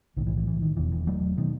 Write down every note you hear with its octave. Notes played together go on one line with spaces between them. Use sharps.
B1 A2 D#3
E3
E3
E3
D#3
E1 E2 B2 E3
E3
F#3 A3
B2 D#3